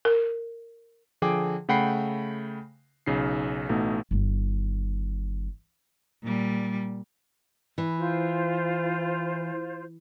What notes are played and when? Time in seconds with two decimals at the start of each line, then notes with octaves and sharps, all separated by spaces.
0.05 A#4
1.22 D3 F3 G#4 G5 D6
1.69 C#3 A3 F#5 G5 B5 C7
3.06 B1 C#3 D#4 C7
3.69 A1 B2 A3 D#4
4.11 G1 D#3
6.23 A#2 G3
7.78 E3
7.98 F4 C5